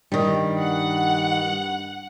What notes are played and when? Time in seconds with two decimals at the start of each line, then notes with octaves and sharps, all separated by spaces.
0.12 G2 D#3 G3
0.60 F#5